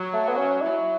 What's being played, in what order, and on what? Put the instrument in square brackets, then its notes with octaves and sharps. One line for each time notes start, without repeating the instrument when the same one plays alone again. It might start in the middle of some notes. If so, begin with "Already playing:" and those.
Already playing: [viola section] F#3
[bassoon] A3
B3
C#4
[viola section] F#3 [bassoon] E4